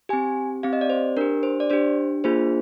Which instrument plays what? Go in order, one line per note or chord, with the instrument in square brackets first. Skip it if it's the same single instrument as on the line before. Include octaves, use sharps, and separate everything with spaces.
[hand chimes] C4 G4 G#5
C4 G4 F5
D#5
D5
C5
D4 G4 A#4
C5
D5
D4 G4 C5
A#3 D4 F4 G#4 C5